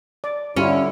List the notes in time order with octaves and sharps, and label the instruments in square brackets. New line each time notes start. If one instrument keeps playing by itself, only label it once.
[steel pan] D5
[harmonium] D3 E4 [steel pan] G3 F4 [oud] C#4